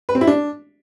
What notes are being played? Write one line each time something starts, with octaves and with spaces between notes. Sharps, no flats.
B4
C4
E4
D4